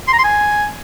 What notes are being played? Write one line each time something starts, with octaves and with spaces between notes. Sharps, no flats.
C6
A#5
C6
G#5